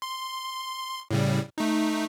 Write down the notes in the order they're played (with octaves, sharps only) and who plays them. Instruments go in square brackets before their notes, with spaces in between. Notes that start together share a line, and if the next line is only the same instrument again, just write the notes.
[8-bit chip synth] C6
A2 C#3 G3
A3 D#4